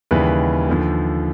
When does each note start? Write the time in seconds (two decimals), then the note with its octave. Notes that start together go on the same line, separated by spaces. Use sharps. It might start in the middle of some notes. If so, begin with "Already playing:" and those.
0.11 D#2 C#3 E3 G3 B4
0.69 D#2 D3 F3